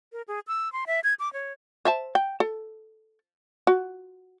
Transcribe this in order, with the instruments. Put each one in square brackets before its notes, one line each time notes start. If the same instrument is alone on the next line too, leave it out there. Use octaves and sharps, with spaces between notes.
[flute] A#4
G#4
E6
C6
E5
G#6
D6
C#5
[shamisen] C5 E5 A5
G5
A4
F#4